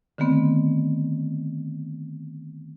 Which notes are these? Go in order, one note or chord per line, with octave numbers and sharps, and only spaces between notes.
D3 D#3 A3 B3 C4